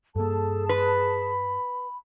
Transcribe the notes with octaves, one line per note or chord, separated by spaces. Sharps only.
G2 A#3 G#4 A4 A5
B4 B5